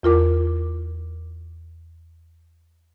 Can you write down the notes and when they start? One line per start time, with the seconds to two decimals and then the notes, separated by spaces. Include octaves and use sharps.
0.03 E2 F4 A#4 D6